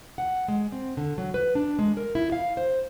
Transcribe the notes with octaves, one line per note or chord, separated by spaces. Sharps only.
F#5
G#3
C4
D3
F#3
B4
D4
G#3
A#4
E4
F5
C5